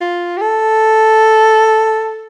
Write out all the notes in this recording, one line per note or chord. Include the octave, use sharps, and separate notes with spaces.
F4
G4
A4